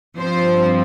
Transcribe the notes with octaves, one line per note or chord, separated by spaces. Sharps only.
G2 F3 C4 C5